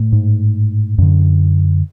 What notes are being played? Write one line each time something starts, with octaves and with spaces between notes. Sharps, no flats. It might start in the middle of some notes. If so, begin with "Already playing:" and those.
Already playing: A2 A3
G#2
F#2 D3